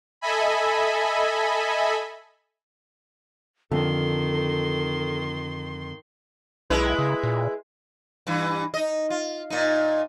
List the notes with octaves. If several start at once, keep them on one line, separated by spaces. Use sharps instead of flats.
A4 D#5 E5 G#5 B5
F2 D3 D#3 A4 C6
B1 G#3 E4 B4
C#3
A#2
G2 E3
D#4 D#5
F4
A#2 D#4